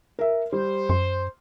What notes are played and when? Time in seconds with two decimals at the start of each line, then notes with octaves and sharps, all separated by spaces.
0.19 A#4 E5
0.52 G3 C5
0.89 F#2 C6